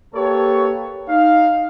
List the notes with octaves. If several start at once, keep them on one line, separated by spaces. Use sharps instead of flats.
A#3 G4 A4 B4 C#5
D#4 F5